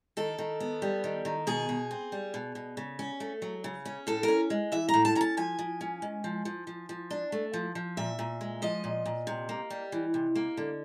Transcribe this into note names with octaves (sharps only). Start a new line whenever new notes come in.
D#3 A4
D#3
B3
G3
D#3
D#3
B2 G#4
B2
C4
G3
B2
B2
C#3
C#4
A3
F#3
C#3
C#4
A2 A4
A#4
C#4
G#3
E3 E5
A#5
A2
A5
C#4 A#5
A5
F3 G#5
F3
C#4
G#3
F3
F3
F3
F3
D4
A3
F3
F3
A#2 E5
A#2
G#3
F3 D#5
A#2
A#2
C3
A#3
G3
E3
C3
A#3
D3